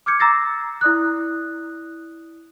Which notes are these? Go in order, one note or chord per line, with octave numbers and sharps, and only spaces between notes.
D6 F6 G6 G#6 C#7
A#5 D6 E6 A6 A#6 C7
E4 D5 D#6 F#6